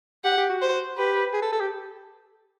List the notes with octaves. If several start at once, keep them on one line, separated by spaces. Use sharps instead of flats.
G4 F#5
G4
F#4
C5
G4 B4
G#4
A4
A4
G4